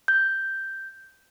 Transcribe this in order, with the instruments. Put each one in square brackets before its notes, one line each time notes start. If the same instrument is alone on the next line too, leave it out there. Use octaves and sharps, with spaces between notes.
[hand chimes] G6